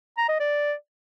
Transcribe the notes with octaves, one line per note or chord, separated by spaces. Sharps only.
A#5
D#5
D5